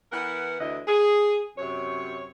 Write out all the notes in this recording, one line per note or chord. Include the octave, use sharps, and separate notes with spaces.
E3 B3 A#4 F#5
D2 D3 E3 E4 D#5
G#4
F#2 C3 C#5